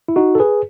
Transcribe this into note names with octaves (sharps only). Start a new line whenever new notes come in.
E4
D#4 F#4
A4
G#4 B4